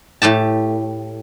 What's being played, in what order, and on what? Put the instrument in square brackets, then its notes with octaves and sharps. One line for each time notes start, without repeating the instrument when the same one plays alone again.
[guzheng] A2 A3 G4 A5